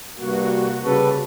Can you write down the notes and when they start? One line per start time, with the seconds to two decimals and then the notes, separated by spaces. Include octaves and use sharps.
0.18 G2 C3 A#3 F#4
0.84 C#3 G3 A4 B4